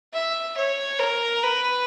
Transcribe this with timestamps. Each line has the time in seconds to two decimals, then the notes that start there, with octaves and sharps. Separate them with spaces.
0.13 E5
0.57 C#5
0.99 A#4
1.43 B4